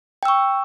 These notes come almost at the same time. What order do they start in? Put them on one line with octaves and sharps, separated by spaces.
G5 E6 C#6